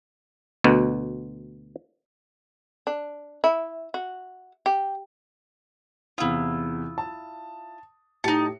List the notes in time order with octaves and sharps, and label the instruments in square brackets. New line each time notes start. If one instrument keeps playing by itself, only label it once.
[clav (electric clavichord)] D2 B2
[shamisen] D4
E4
F#4
G4
[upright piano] E2 C3 D#6 [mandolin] E4 F4
[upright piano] A5
[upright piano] A2 G4 C#7 [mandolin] D#4 A5